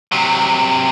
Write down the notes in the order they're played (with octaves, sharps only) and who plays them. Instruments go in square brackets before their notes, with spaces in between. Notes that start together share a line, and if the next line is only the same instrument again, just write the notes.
[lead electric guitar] C3 F#3